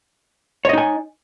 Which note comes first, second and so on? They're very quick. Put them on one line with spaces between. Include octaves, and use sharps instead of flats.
C#5 D#5 D#4 G#5